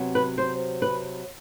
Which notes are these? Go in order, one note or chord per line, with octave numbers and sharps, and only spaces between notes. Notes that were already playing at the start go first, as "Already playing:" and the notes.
Already playing: C3 F#3 B3
B4
C5
B4